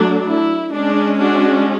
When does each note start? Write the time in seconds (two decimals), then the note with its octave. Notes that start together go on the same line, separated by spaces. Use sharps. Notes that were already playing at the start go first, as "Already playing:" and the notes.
Already playing: F#3 A3 D4
0.25 E4
0.71 G#3 C#4 D4
1.18 D4 F#4